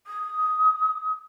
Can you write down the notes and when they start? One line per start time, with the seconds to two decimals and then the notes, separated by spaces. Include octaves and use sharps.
0.06 D#6